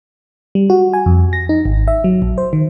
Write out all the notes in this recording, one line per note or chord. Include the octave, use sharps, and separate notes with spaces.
G3
F#4
G#5
F2
A#6
D#4
G#1
E5
F#3
A#1
C5
D#3